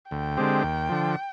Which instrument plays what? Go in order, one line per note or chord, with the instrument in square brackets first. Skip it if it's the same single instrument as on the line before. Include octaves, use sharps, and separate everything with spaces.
[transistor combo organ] D2 [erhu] G5
[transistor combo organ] D3 G#3 C4 G4
D#2
D3 F3